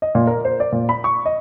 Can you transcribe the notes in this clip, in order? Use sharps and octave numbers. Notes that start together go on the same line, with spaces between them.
D#5
A#2
A#4
C5
D5
A#2
B5
C#6
D#5